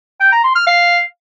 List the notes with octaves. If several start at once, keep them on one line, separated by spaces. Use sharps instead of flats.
G5
A#5
C6
F6
F5